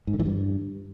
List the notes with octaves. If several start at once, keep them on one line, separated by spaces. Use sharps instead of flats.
G#2
D3
E3
G2